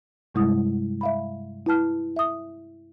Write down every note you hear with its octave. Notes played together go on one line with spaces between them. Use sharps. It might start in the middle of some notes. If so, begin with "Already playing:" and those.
G2 C3 G3 G#3 E4 D#6
E5 F5 B5
E4 B4 A5 F6
E5 D#6